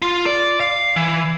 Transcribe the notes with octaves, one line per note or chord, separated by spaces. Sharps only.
F4
D5
F5
E3